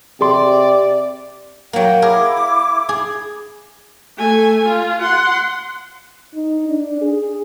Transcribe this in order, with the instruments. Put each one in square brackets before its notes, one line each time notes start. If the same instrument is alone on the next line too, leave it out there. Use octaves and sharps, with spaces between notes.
[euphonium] C3 [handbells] G#4 C6 [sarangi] D5
[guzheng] F#3 A#3 [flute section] G5
[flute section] E4 D6 [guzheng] G#4 A#4
[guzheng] G#4
[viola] A3 G#5
F4
F#5 C6
[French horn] D#4
D4
G#4